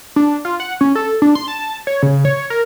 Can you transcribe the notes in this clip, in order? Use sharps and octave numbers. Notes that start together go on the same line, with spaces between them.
D4
F4
F#5
C#4
A4
D4
C6
A5
C#5
C#3
C#5
A#4